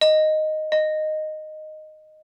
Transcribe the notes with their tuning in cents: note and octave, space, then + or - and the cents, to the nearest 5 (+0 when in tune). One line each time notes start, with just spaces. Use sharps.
D#5 -5
D#5 -10